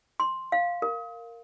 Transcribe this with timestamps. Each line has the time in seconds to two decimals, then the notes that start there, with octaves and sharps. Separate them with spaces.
0.20 C6
0.52 F5
0.82 A#4